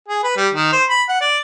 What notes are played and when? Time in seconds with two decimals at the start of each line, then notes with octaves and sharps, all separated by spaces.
0.08 G#4
0.23 B4
0.37 G3
0.54 D#3
0.72 C5
0.90 B5
1.09 F#5
1.21 D5